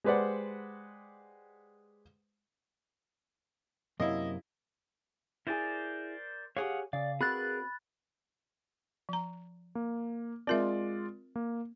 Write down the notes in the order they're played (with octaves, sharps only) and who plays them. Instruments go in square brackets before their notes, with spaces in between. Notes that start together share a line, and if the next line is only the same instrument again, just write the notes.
[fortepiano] G#3 G4 B4 C5 D5 F#5
[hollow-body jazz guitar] F#2 C3 A#3 [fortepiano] E4 D#5
[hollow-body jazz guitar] E4 G#4 [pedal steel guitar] A#4 C5 D5
[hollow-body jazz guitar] G4 G#4 C#5 [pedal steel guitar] F5 F#5 D#6
[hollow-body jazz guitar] C#3 [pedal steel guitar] D5 [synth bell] F5
[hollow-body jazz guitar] C4 F#4 [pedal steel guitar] G#4 A#4 B4 [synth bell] B5 F#6 A6
[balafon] F3 A#5
[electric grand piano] A#3
[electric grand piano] G#3 F4 D5 [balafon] C4 A#4 E5
[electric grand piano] A#3